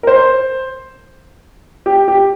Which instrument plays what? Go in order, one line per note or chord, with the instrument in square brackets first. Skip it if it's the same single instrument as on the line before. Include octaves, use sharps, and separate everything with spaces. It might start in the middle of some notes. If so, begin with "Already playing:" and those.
[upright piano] A#4
C5
G4
G4